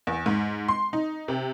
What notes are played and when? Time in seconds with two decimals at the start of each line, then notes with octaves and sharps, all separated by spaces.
0.07 E2
0.26 G#2
0.68 C6
0.93 D#4
1.28 C3